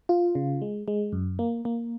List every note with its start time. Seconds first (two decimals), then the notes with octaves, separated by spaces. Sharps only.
0.09 F4
0.35 C#3
0.62 G#3
0.88 G#3
1.13 F#2
1.39 A#3
1.65 A#3